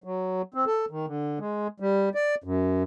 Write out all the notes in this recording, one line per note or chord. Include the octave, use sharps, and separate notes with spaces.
F#3
C4
A4
D#3
D3
G#3
G3
D5
F#2